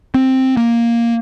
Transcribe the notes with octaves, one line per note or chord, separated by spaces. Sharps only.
C4
A#3